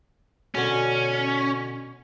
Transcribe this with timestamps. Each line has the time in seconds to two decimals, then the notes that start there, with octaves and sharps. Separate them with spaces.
0.55 B2 D3 C#4